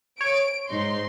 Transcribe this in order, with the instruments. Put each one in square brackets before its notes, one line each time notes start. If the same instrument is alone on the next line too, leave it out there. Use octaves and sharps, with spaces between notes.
[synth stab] C#5 [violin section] D7
[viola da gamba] G#2 D#4 [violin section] C6